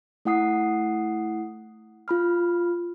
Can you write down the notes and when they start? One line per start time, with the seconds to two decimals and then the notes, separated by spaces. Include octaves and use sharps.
0.25 A3 E4 F#5 D#6 C7
2.08 F4 B5 F6